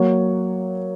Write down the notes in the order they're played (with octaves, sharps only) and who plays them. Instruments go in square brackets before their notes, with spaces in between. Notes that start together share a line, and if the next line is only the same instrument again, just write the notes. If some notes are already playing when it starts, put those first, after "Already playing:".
Already playing: [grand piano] F#3 A#3 F#4 C#5